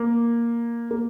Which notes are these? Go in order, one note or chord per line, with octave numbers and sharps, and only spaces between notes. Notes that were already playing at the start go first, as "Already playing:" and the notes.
Already playing: A#3
A#3